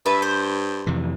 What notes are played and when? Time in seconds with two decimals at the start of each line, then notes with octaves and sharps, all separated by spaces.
0.06 G2 B4 E5 A5
0.22 C5
0.87 F2 C3 E3